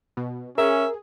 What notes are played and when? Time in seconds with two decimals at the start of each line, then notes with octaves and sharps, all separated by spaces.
0.17 B2
0.58 C#4 G#4 A#4 E5